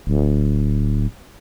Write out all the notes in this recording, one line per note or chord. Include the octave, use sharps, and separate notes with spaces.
D1